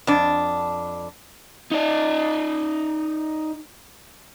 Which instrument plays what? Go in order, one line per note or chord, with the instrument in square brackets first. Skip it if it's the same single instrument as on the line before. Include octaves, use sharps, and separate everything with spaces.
[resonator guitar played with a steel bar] F2 D4
[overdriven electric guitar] D#4 D5